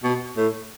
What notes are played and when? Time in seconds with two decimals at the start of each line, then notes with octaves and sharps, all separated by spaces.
0.03 B2
0.37 A2